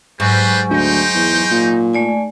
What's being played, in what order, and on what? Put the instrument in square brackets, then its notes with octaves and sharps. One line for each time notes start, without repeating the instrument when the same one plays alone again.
[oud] G#2 [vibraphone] F#3 G#5 C#6 [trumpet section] G3 B4 C5
[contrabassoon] D2 [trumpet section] D#4 C5 G5
[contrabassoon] E2
A#2
[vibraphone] A3 D5 G#5